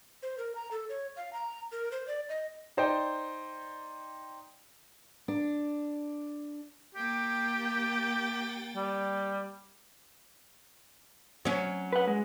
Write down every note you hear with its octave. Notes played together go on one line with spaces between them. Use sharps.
C5
A#4
A#5
A4
C#5
F5
A#5
A#4
C5
D5
D#5
D#4 C5 D5 G5
D4
A#3 G4 G5 A6
G3
F#3 C#4
B4 F#5
G#3